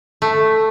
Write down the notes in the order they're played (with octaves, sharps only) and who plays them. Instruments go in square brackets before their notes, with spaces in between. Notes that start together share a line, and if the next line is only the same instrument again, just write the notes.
[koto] A3